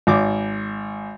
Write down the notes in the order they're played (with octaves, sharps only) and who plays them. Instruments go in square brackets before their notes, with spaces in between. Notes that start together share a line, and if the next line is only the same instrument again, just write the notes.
[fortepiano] G#1 D6